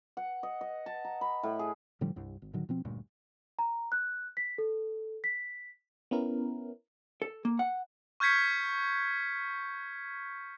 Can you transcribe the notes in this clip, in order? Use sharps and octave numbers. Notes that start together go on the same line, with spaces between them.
F#5
D#5
D#5
A5
A#5
B5
A2
G#4
A2 D3 F3 G3
C2 G2
G#1
A2 D3 D#3 F#3
B2 F3 C4
D#1 D2 G2 A#2
A#5
F#6
B6
A4
B6
B3 C#4 E4 A#4
A4
A#3
F#5
C#6 F6 G6 G#6 B6 C#7